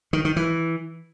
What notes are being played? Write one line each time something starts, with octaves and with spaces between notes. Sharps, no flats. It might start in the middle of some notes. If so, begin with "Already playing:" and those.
D#3
D#3
E3